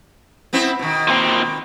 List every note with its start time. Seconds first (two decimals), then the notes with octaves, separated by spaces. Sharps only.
0.53 B3 C4 E4
0.79 B2 D#3
1.08 A#2 C4